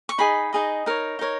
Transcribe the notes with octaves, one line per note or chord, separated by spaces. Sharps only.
C#6
D#4 G#4 D#5 B5
D#4 G#4 D#5
D#4 A#4 C#5
D#4 A#4 C#5